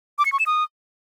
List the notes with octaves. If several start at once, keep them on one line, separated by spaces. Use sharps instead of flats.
D6
C#7
C#6
E7
D#6